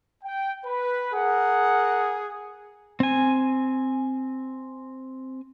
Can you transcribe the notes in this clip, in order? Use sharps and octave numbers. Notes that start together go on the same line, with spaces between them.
G5
B4
G#4 A#4 F#5
C4 G#5